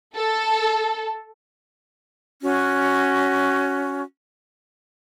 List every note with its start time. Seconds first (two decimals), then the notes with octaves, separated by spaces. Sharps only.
0.15 A4
2.42 C#4 F#4